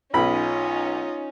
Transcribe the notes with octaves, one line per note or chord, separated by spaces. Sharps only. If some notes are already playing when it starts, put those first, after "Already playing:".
B1 C#4 D#4 F4 D#5 B5